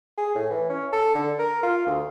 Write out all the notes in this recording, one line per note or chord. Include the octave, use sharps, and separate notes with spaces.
G#4
A2
E3
C#4
A4
D3
A#4
F4
D2